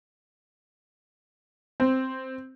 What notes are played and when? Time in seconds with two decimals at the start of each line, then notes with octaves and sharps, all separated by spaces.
1.80 C4